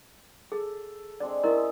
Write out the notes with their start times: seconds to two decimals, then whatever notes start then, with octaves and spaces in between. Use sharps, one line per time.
0.52 G#4 A4
1.20 G#3 C4 D4 D5
1.44 C#4 E4 A#4 D#5 E5 D#6